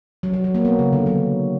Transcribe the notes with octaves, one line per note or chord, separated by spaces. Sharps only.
F#3
F#3
F#3
A#3
B3
C#3
D3
F#3